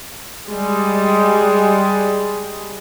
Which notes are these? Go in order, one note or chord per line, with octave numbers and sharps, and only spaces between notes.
G3 G#3